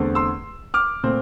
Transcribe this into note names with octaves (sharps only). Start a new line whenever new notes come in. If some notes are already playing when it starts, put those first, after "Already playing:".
Already playing: E2 D3 A3 C4
C6 E6
D6 F6
A#2 A3 C4